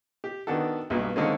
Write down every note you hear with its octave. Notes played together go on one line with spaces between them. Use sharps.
G4
D#3 B3 D4 F#4 A4
B1 G2 A#2 F#3
D3 D#3 G#3 A#3 C4 C#4